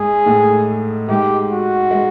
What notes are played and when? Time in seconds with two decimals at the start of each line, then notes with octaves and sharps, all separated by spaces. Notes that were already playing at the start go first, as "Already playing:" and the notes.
Already playing: G#2 G#3 G#4
0.26 A2 A3
1.09 G#2 G#3 G4
1.51 F#4
1.91 G#3